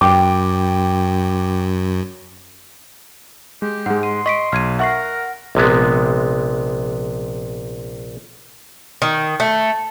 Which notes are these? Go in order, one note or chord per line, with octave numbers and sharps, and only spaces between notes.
F#2 G5 D6
G#3 G4
G#2 G#3 F#5
C6 D#7
D#5 C#6 B6 D7
B1 F6 G#6 D#7
A#4 E5 F#5 C#6 C7
A#1 C3 G#3 B3
D#3
A3